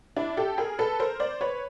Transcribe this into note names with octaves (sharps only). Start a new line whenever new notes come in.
D4 E4
G4 A4
G#4 A#4
A4 B4
A#4 C5
C5 D5
B4 C#5